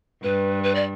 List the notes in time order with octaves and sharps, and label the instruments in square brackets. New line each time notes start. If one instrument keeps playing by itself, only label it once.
[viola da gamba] G2 [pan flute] B4
[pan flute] B4
D5